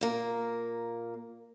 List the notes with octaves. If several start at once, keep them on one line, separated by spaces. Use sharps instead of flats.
A#2 A#3